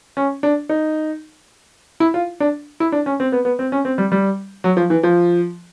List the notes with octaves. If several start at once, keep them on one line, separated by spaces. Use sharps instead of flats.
C#4
D4
D#4
E4
F4
D4
E4
D4
C#4
C4
B3
B3
C4
C#4
C4
G3
G3
F#3
F3
E3
F3